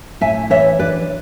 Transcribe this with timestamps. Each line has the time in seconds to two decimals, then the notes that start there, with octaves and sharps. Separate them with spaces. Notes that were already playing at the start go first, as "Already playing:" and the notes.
0.21 A2 E5 G#5
0.50 E3 C#5 E5
0.79 D4 B4 D5